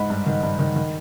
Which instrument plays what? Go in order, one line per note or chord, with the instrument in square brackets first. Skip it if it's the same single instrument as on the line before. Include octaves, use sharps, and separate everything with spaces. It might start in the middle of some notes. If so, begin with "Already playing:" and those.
Already playing: [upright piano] G#2 B5
G2
D#3
G2
D#3
D#3